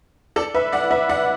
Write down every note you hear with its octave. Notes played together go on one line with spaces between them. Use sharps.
A4 D5
B4 E5
D5 F#5
B4 E5
D5 F#5